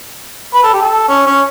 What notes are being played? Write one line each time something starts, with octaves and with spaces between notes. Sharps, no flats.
B4
A4
G4
A4
C#4
C#4